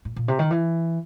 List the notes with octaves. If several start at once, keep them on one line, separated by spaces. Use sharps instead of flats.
A2
A#2
C3
D#3
E3